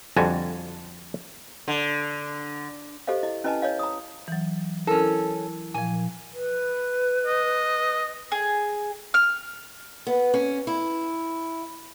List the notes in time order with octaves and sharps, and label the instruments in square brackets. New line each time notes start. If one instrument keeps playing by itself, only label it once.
[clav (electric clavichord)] F2 D3 G3 F#4 G#5 A5
[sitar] D3
[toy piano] G4 A4 C5 D#5 F5
E4 D#5
C#4 E4 B4 D#5 G#5 A5
C#5 D#5 F5
A#5 D#6
[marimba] E3 F#3
[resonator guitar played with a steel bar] C#4 A4 [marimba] E4 A#4
[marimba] A#2 F3 [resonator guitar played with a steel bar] G#5
[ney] B4
[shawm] D#5
[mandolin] G#4
F6
[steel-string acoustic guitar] B3
C#4
E4